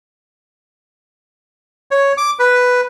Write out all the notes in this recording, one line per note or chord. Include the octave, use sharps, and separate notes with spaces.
C#5
D6
B4